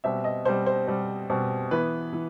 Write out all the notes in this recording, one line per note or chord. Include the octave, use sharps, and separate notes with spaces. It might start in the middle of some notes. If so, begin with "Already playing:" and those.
B2 G3 C4 E5
D#5
B2 G3 C4 C5
C5
B2 G3 C4
B2 G3 C4
E3 B3 B4
E3